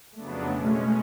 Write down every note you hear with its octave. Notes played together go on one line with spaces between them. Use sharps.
F2 C#3 F#3 A3 B3 D4
B2 G#3 C#4